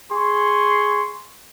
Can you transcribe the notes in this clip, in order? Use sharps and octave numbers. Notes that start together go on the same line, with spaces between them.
G#4 C6 C#6